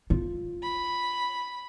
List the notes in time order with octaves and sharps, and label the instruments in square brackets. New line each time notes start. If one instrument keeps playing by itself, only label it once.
[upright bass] F4
[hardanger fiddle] B5